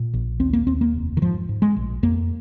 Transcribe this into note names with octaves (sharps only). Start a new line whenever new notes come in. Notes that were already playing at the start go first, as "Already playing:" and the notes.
Already playing: A#2
A#1
D#2 C4
A#3
D#2 C4
A#3
F1
D#3
G#2 F3
G#2
G#3
A#1
F2 A#3